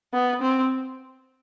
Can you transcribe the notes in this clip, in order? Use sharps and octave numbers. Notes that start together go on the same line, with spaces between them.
B3
C4